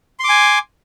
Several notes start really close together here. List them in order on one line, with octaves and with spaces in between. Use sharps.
C6 D6 G#5